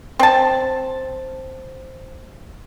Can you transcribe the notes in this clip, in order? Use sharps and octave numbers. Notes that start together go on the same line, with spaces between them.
C4 A5